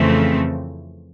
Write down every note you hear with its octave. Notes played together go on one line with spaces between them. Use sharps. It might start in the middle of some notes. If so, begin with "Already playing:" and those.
Already playing: F2 C#3 E3 A3 C4